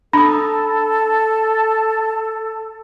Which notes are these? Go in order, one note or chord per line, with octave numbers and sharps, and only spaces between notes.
D4 A4 B5 D#6